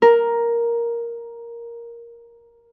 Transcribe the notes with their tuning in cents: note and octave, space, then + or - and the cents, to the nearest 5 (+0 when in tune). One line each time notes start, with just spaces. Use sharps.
A#4 +5